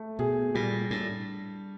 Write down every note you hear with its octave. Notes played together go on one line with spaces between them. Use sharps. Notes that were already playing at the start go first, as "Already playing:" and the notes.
Already playing: A3
B2 G#4
A#2 G3
A2 D4